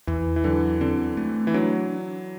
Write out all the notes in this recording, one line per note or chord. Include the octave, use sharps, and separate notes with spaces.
E2 E3
E3
D3 F#3
D3 C4
A3
E3
F#3 D4